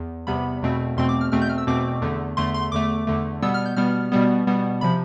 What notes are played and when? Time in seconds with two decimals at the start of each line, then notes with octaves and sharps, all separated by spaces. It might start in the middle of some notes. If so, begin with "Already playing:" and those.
Already playing: E2
0.27 E2 C3 G3 B3 B5
0.62 E2 B2 A3 C4
0.97 E2 B2 A3 C4 C6
1.09 D6
1.21 F6
1.32 E2 B2 A3 C4 F6
1.42 G6
1.49 F6
1.58 E6
1.67 E2 B2 A3 C4 D6
2.02 E2 D3 A3
2.37 E2 D3 A3 C6
2.54 C6
2.72 E2 D3 A3 D6
3.07 E2 D3 A3
3.42 B2 G3 B3 E6
3.54 F6
3.66 G6
3.76 B2 G3 B3 F6
4.12 B2 G3 B3
4.47 B2 G3 B3
4.81 C3 F3 B5